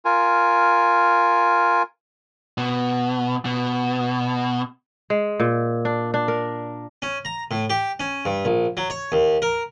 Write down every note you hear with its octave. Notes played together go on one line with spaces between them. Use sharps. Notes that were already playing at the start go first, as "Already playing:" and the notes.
F4 A#4 G#5
B2
B2
G#3
A#2
D4
D4
A#4
C#4
A#5
A2
G4
C#4
G2
A#1
F#3
C#5
D#2
A#4